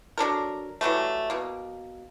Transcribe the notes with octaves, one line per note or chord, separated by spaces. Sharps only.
F#3 D4 A4 A#4
E3 F#3 G3 A3
B2 A#3